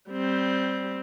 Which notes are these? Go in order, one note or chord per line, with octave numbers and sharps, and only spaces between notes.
G3 C4